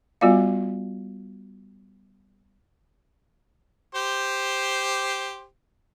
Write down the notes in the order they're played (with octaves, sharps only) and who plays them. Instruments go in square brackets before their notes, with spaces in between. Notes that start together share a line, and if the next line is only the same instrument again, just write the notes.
[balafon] G3 B3 F4 F#4 D5 F5
[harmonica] G4 C5